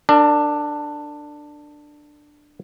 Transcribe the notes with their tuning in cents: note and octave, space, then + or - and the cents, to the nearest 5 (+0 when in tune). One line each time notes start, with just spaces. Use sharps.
D4 +10 A#4 -40